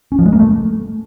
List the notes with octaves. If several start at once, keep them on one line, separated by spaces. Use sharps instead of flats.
C#4
F3
G#3
A#3
A3